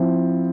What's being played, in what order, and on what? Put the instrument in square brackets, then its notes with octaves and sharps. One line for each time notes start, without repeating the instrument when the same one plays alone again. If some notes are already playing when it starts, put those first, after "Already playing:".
Already playing: [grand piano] F3 C4 E4